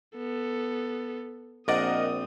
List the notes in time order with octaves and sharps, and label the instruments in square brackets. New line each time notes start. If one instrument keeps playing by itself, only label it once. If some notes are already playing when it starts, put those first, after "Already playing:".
[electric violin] B3 A4
[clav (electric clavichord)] A#1 D5 [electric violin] C4 D#6 [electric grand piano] A#4 D#5 F#5